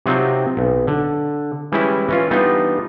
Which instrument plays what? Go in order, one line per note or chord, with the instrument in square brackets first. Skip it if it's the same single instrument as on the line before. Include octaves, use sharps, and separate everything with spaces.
[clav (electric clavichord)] C3 F#3 C4 D#4 F4
B1
D3
E3 G3 G#3 C#4 E4
E3 C#4 F4
E3 G3 B3 D4 D#4 F4